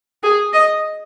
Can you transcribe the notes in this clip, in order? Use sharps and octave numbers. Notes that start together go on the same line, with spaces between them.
G#4
D#5